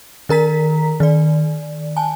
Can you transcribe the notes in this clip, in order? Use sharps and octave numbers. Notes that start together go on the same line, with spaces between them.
D#3 A#4 A#5 B6
D#3 D5
G#5 A5